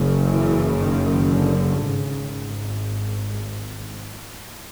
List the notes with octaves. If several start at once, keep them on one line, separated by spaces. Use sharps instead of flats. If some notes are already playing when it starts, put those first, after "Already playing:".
Already playing: F#1 F#2 C#3
E3
D#3
D3
G#1 G#2 C#3